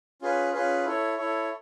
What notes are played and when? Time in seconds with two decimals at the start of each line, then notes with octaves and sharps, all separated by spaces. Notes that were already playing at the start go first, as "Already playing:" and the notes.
0.22 C#4 F4 G#4 B4
0.54 C#4 F4 G#4 B4
0.85 E4 A4 C#5
1.18 E4 A4 C#5